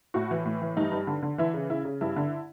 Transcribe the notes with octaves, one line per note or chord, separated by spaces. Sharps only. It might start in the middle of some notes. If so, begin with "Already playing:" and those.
A2 F#4
E3
A2
E3
G2 D#4
G2
D3
D3
E3 E4
C#3
C#3 E4
C#3
G2 E4
D3